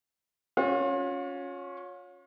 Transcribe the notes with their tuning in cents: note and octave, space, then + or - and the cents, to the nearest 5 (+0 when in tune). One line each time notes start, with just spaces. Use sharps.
C#4 +0 F4 +40